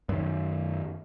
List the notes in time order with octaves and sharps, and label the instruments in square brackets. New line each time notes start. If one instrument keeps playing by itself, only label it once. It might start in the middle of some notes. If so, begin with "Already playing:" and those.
[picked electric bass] F#2 D#3